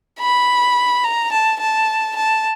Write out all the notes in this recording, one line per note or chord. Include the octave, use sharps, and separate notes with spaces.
B5
A#5
A5
A5
A5